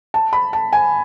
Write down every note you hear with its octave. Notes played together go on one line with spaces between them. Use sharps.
A5
B5
A5
G#5